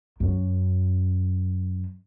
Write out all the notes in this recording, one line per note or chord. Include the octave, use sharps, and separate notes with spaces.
F#2